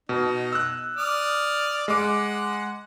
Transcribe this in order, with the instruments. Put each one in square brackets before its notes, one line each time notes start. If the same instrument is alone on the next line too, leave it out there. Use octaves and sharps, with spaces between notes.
[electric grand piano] B2 [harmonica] D#4
[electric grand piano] E6 F#6
[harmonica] D5 D#6 F6
[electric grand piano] G#3 D6 [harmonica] F#5